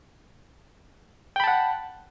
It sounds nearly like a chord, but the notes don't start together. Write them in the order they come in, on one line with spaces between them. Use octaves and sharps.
G5 B5 A5 F#5